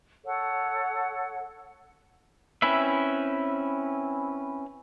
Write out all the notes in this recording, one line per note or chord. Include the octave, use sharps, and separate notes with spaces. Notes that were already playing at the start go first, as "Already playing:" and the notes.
A4 C#5 F#5
C4 C#4 E4 B4 E5